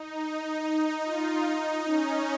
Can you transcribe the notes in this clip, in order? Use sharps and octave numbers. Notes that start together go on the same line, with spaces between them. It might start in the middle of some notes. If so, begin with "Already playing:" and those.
Already playing: D#4
D#4
D#4
F4
D#4
C#4